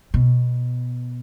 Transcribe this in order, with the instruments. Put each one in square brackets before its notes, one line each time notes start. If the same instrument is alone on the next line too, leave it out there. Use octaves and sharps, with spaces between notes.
[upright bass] B2